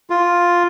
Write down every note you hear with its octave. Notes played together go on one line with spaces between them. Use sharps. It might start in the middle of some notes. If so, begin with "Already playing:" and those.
F4